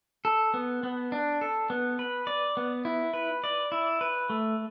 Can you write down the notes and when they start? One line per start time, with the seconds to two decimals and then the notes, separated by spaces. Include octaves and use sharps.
0.25 A4
0.54 B3
0.83 B3
1.12 D4
1.41 A4
1.70 B3
1.99 B4
2.27 D5
2.57 B3
2.85 E4
3.14 B4
3.44 D5
3.72 E4
4.01 B4
4.30 A3